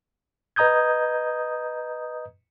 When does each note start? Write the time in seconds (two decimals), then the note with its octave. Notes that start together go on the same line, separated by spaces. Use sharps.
0.56 B4 D#5 A#5 D#6 G6 G#6